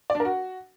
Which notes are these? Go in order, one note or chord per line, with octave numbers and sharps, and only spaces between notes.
D5
D4
A#4
F#4